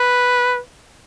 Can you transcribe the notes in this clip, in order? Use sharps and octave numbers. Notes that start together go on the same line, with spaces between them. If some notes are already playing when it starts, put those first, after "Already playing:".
Already playing: B4